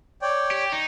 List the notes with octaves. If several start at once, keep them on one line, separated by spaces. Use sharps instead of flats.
C#5 D5 G5
G4
D#4